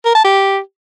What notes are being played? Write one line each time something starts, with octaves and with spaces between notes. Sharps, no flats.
A#4
A5
G4